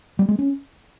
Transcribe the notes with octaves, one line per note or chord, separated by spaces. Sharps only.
G3
G#3
C#4